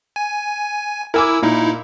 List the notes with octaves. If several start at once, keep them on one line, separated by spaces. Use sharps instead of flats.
G#5
E4 A#4 G#5 D6 E6
A#2 D#4 E4